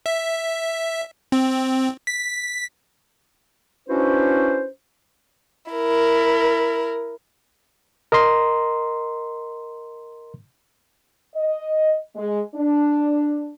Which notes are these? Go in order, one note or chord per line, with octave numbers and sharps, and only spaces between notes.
E5
C4
B6
C#4 D4 E4 F#4 B4 C5
E4 A#4
A#4 D#5 A#5 C6
D#5
G#3
D4